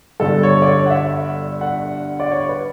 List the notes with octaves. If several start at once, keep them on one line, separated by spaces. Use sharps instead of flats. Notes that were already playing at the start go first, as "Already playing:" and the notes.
G1 G2 D3 A4
C#5
D5
C#5
F#5
E5
F#5
D5
C#5
B4